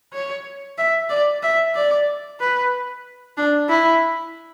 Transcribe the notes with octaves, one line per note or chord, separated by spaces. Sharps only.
C#5
E5
D5
E5
D5
B4
D4
E4